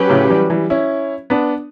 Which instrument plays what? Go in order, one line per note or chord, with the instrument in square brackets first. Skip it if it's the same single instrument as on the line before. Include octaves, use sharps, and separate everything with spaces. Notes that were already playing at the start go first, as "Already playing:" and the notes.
Already playing: [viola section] F#3 C#4 G4 B4
[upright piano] A2 C#3
E3 G3
E3 G3
C#4 E4
B3 D4